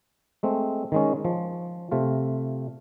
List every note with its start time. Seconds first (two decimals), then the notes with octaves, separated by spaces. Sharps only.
0.43 G#3 A3 C4
0.92 D#3 G#3 C#4
1.25 F3
1.91 C3 A3 F4